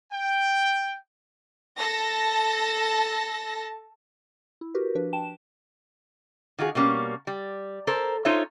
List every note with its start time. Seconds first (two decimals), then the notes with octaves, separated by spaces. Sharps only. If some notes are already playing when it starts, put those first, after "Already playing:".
0.12 G5
1.77 A4 A5 A#6
4.61 E4
4.75 F#4 G4 A#4 B4
4.95 F3 D4 B4
5.13 G5 A5 E7
6.58 D#3 F4 F#4 G#4
6.75 B2 G3 A#3 C#4
7.27 G3
7.87 A4 A#4 C5
8.25 D#4 F4 A4 C5 C#5 E5